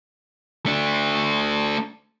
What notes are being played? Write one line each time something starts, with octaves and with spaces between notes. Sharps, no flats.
A3 D4